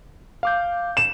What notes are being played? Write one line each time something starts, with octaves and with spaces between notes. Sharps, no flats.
F5 D6 G6
E7